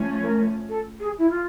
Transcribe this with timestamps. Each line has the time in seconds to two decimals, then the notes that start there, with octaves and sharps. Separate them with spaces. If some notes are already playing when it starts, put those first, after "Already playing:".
Already playing: F3 A3 C#4
0.23 A#4
0.69 A4
1.00 G#4
1.18 E4
1.30 F4